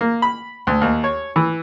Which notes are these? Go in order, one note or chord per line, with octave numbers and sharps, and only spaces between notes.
A#3
B5
D2
D#2
C#5
E3